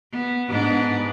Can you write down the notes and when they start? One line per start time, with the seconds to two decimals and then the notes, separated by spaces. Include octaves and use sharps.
0.12 B3
0.48 G#2 B3 D4